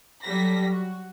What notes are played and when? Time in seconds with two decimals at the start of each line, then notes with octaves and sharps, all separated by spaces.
0.23 F#3 G3 A4 A#6 B6
0.69 F#4